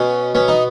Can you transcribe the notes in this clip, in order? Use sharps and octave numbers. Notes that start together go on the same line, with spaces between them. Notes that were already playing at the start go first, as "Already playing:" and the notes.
Already playing: B2 C#4
B3 C#4
D#4